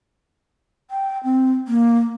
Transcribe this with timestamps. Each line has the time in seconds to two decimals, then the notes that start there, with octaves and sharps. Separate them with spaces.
0.91 G5
1.24 C4
1.68 A#3